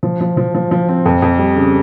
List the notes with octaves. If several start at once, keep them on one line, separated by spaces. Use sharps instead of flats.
F3
F3
F3
F3
F3
C4
F2
F2
G3
C#3